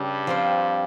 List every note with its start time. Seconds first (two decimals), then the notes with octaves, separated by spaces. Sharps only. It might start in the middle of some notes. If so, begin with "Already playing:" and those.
Already playing: G2 C#3 G3 C#4
0.27 F3 C4 F4